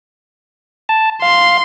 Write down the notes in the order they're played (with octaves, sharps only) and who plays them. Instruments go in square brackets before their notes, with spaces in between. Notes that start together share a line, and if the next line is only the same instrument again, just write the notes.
[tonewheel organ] A5
[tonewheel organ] F5 [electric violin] C6